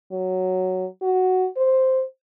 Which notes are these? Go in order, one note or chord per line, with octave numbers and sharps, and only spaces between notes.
F#3
F#4
C5